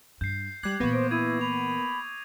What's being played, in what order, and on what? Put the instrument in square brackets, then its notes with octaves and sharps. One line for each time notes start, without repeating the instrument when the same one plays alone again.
[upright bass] G2 [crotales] G6 C7
[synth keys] G3 F#6 [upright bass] G#3 [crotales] D6 G#6 C7
[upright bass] A#2 E3 [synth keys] A#3 B3 B4 [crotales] C#6 A#6
[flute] C5 [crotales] D6 A#6 D7
[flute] E4 [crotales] D#6 G#6 D#7
[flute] B5 [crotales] F7